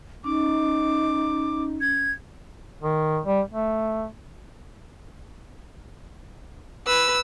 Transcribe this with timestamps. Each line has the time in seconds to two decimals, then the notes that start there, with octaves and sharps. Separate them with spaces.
0.24 C#4 D#4 D6
1.81 G#6
2.82 D#3
3.26 G3
3.51 A3
6.87 B4 E6